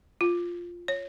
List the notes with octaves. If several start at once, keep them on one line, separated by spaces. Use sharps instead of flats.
F4
C#5